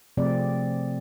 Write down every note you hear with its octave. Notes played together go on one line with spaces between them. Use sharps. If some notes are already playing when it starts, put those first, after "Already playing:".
C3 F3 A3 C4 G#4 D5